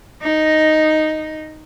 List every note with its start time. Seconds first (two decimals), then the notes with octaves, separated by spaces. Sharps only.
0.22 D#4 D#5